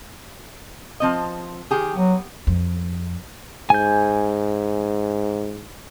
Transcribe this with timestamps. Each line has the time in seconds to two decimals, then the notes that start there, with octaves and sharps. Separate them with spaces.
1.00 F3 C4 D#5
1.71 D#3 G4 G#4
1.96 F#3 B3
2.47 F2
3.70 G#2 G#5 G6